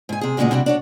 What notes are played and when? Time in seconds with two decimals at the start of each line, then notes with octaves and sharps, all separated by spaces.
0.09 G#2 G#5
0.21 C3 G#4
0.37 D2 A#2 C#3 G#3 F#4 G#4
0.51 C3 G3 D4 F#4
0.66 D4 F#4 C#5